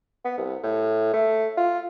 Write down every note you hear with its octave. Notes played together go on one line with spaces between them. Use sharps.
B3
C2
A2
A3
F4